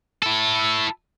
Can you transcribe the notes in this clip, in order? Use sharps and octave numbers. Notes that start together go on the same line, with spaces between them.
E4 A4